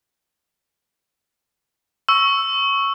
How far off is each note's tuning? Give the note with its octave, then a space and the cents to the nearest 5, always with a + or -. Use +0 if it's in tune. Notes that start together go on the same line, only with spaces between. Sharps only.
C#6 +0 E6 +0